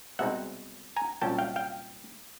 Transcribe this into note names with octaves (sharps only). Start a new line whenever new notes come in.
C2 B2 G#3 C4 D#4 E5 F#5
G#5 A#5
C2 A#2 F#3 A#3 C#4 G5 A5
F5 G5
F5 G5